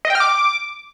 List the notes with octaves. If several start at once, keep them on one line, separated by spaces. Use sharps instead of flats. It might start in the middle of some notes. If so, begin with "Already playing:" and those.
D#5
G5
F6
D6